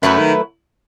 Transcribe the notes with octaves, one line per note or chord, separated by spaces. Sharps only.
F#2 F#3 A3 E4 B4
D#3